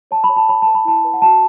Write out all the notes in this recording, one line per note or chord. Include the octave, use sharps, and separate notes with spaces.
C#5 A5
B5
C#5
A5
C#5 B5
B4 A5
B5
E4 A5
B4
F#5
F#4 A5